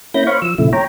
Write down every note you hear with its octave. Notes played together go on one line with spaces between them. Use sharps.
A#3 C#4 E4 B5 G6 A#6
C5 C#5 F5 B5 C#6
F3 E6
A#2 C#3 F3 A3 E4
C#5 G5 A#5